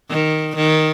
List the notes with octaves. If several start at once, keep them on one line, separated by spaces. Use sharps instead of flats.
D#3
D#3